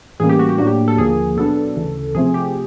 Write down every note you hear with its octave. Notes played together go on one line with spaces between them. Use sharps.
A2 E3 G3 A#3 C#4 G#4
G4
F#4
G4
A2 F#3 A#3 D4 F#4
G4
A4
D#2 D3 F3 A#3 G#4
B2 F#3 B3 D4 A4
D2 C#3 E3
C3 F3 A3 C4 G#4
G4